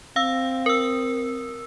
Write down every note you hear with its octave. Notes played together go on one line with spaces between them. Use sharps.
C4 F5 E6
A#4 E6